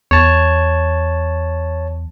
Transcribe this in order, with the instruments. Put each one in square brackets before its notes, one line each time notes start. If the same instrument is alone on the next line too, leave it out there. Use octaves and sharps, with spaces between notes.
[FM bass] E2 [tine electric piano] C#5 A5